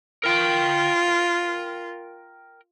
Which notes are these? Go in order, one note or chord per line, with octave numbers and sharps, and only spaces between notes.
F4 A#4 G5